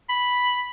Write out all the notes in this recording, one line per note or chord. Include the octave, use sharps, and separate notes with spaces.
B5